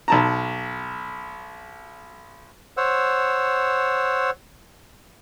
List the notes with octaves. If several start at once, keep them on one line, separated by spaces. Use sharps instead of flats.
B1 A5 A#5
C5 C#5 F#5 E6